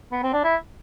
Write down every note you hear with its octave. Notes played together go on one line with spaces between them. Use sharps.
B3
C4
D4
E4